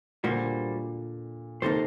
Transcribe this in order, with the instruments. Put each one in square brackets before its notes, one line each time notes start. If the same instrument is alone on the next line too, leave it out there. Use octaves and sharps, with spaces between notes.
[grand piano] A#2 D3 [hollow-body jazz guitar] G3 A#3 F#4 C5
[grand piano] C3 D#3 [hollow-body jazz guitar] A#3 D#4 A4 C5